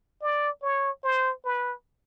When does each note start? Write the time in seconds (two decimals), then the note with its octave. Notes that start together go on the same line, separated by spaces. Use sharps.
0.22 D5
0.62 C#5
1.04 C5
1.45 B4